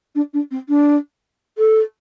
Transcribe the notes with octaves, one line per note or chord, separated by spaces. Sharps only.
D4
D4
C4
D4
A4